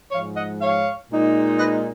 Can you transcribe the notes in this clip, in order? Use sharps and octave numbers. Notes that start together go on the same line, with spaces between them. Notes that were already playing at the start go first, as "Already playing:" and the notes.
G#2 F3 G#3 C#5 F5
D#5 F#5
C#5 F5
A#2 G#3 D#4
B4 D#5